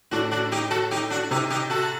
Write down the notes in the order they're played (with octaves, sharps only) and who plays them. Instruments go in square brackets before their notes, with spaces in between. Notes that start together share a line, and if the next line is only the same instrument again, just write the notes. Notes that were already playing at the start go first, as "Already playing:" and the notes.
[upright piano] A2 [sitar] D4 F#4
[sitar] D4 F#4
D#4 G4
F#4 A4
D#4 G4
D4 F#4
[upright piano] C3 [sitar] D#4 G4
[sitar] D#4 G4
F#4 A4